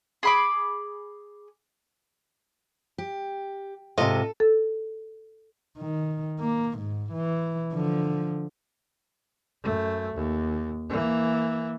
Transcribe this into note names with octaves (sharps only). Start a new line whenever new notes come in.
G#4 B5 D6
G4
G#2 C3 F4 A4 D#5
A4
D#3
A#3
G#2
E3
D3 F3
F#2 A3
D#2
E3 A#3